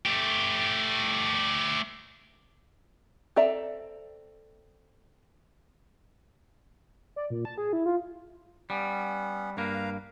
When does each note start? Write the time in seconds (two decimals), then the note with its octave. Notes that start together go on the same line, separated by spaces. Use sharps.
0.06 A3 G4
3.36 C4 A4 D5 E5 A#5
7.16 D5
7.30 A#2
7.45 A5
7.58 G#4
7.73 E4
7.86 F4
8.70 G3 B3 C#4 F#5
9.57 G2 A#3 B4 F5 A#5